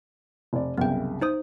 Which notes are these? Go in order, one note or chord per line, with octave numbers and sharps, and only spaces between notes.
F1 D5
C2 F#2 C#3 B3 G5
D#4 C5 D#6